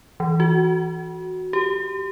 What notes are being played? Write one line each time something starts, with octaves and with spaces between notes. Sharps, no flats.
E3
F#4
G4